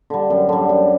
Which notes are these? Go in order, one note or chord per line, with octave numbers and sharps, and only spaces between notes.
D3 G3
F#2
D3 G3
F#2